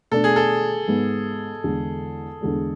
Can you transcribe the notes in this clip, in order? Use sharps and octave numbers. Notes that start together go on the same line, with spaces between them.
B2 A3 D4 A4
G#4
A4
G#2 G#3 B3
E2 D3 G#3
E2 D3 G#3 D4